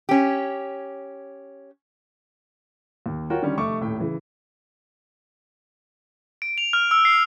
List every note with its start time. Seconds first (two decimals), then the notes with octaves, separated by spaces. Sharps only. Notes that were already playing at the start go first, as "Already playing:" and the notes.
0.09 C#4 G4
3.06 D#2
3.30 F4 F#4 A#4 C#5 G5
3.42 D3 D#3 G3 C#4
3.58 F1 A3 C#6 D6
3.81 D#1 A2 G4 G5
4.00 C#3 E3
6.42 D7
6.58 F7
6.73 F6
6.91 E6
7.05 C7